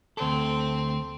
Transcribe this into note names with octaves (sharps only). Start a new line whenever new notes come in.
D2 C4 A4